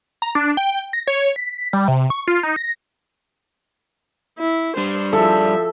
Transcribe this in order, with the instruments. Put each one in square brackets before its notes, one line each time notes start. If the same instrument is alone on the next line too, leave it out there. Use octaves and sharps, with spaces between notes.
[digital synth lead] A#5
D4
G5
A#6
C#5
B6
G3
C3
C#6
F4
D#4
A#6
[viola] E4
[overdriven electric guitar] G3 D4 [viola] C5
[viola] F3 E5 [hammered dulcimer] A4